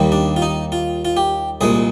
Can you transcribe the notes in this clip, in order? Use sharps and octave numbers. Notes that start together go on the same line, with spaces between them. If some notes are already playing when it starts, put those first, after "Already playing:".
Already playing: D#2 D#3 G3 A#3
D4
F4
D#4
F4
F4
G4
C2 A#2 G#3 G#4